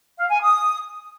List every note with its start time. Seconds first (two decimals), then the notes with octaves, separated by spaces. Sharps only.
0.17 F5
0.29 G#5
0.41 D#6